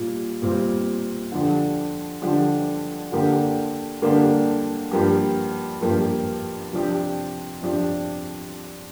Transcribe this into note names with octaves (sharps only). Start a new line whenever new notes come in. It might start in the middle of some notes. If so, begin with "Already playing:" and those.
Already playing: A#2 G3 F4
A#2 G3 C4 F4
D3 F3 D4 G4
D3 F3 D4 G4
D3 A#3 D4 G4
D3 A#3 D4 G4
G2 F3 A#3 G4
G2 F3 A#3 G4
C3 F3 D4 G4
C3 F3 D4 G4